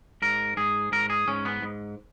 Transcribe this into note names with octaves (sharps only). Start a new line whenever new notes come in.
G#2 A#4
G#2 G#4
G#2 A#4
G#4
G#2 C#4
B3
G#2